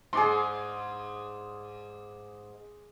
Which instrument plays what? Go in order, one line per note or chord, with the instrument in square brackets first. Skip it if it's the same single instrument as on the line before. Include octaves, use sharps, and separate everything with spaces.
[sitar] G#2 [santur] G#4 D5 C6